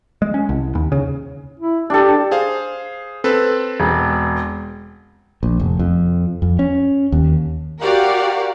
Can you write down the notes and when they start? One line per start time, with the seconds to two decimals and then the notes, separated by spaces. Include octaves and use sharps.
0.22 G#3
0.34 C#4
0.49 C2
0.75 D#2
0.92 C#3
1.59 E4
1.90 D4 G4 A4
2.31 G#4 C5 F5
3.24 C4 A4 B4
3.80 E1
5.43 A#1
5.60 F1
5.79 F2
6.42 F2
6.59 C#4
7.12 D#2
7.82 F#4 G4 A#4 D5 F5 F#5